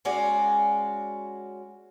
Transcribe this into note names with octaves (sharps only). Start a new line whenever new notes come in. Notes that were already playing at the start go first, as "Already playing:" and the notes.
G#3 C#4 F#4 D5